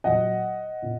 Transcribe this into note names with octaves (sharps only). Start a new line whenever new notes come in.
A#2 F#3 D#5 F#5
A#2